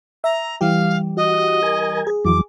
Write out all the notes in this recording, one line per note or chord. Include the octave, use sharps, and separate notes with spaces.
E5 A#5
E3 G3 G4 F5
F#4 D#5
A#4 G#5
G#4
F2 E3 F#3 D6